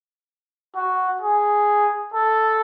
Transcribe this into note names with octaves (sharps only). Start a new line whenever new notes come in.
F#4
G#4
A4